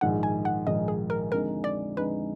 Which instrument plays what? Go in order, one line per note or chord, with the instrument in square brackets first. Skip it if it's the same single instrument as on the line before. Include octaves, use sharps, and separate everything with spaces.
[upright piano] A#1 G#2 D#3 G#3 [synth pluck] F#5
[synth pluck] G#5
F#5
[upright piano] A#1 G#2 D#3 G#3 [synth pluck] D#5
[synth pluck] G#4
A#4
[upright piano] F2 D3 G#3 D#4 [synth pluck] A#4
[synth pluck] D5
[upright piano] F2 D3 G#3 D#4 [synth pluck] B4